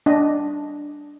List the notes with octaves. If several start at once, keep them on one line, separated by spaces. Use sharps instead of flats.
D4 D#5